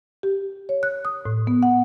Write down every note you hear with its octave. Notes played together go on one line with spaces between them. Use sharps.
G4
C#5
F#6
D#6
A2
B3
F#5